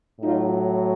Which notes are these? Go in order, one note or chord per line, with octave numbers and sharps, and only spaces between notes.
A2 F#3 D#4 F4